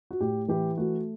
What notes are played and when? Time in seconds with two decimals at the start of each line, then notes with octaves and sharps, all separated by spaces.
0.11 F#4
0.20 A2 G4
0.48 E3 G4
0.77 A3 F#4